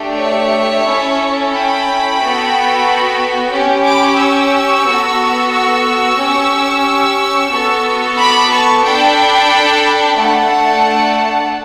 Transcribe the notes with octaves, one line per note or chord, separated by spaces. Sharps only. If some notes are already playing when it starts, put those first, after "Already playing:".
Already playing: A3 D4 G4
C#5 E5
C#4 E4 A4
G5 B5
B3 F#4 A4
C#4 G4
B5 D6
C#6 E6
B3 F#4 A4
C#6 E6
C#4 G4
B3 F#4 A4
B5 D6
A5 C#6
D4 A4 G5 B5
A3 D4 A4 F#5 A5